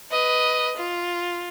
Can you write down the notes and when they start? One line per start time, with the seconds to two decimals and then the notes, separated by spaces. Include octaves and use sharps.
0.11 B4 D#5
0.77 F4